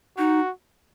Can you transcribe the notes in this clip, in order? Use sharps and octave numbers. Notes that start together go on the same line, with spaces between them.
D#4 F#4